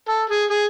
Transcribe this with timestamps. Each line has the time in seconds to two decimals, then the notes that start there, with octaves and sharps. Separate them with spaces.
0.09 A4
0.29 G#4
0.50 G#4